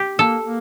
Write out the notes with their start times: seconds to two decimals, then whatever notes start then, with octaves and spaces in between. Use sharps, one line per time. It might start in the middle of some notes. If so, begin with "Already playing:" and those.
Already playing: G4
0.19 A#3 A4
0.44 A#3